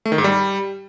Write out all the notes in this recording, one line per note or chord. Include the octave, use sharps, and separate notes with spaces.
A3
D#3
G#2
G3